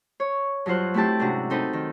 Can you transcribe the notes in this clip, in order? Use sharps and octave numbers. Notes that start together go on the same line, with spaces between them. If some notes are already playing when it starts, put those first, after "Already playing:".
C#5
G2 F#3 F4 C5 F#6
A3 C4 E4 G4 A5
G#2 C3 C#4 D4 F#4
C4 D#4 A4 B4
D#3